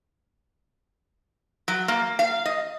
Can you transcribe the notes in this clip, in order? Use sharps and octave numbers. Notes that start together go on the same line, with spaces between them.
F#3
A#3
F5
D#5